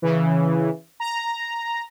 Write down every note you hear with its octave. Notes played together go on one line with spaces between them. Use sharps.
C#3 E3
A#5